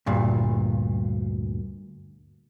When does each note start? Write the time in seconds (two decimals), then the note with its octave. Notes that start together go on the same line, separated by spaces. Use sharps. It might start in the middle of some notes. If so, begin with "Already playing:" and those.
0.06 D2 G2 A#2